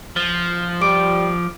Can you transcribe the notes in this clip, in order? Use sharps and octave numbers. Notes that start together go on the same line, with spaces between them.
F3
G3 D6 D7